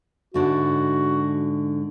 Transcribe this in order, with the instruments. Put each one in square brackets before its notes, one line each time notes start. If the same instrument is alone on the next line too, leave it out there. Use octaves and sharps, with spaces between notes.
[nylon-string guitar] G#2 D3 A3 [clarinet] F#4